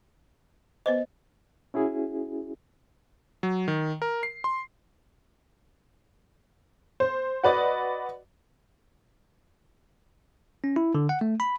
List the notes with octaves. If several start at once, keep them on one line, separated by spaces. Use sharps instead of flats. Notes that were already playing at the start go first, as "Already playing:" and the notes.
B3 B4 C5 D#5
C#4 E4 F#4 G#4
F#3
D#3
A#4
C7
C6
C5
F#4 B4 D5 D#5
C#4
E4
D3
F#5
A3
B5